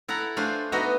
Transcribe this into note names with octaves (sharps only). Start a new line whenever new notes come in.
E4 A4 F#5 A#5
A3 D4 F4 C5 G#5
B3 D#4 F#4 D#5 E5